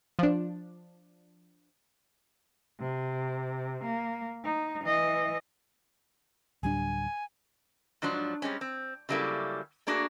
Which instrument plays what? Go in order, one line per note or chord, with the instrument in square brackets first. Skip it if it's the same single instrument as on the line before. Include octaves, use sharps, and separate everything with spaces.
[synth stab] F3 D4
[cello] C3
A#3
D#4
E3 D#5
[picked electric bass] D1 G3 D4 [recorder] G#5
[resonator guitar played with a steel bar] G#2 F3 F#3 D4
G3 G#3 C4 C#4
C4
C#3 F#3 G3 A#3 E4 A4
A3 A#3 D4 F#4 G#4